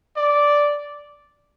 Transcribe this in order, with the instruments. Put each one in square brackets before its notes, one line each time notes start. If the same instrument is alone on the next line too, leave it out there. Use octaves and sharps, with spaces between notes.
[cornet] D5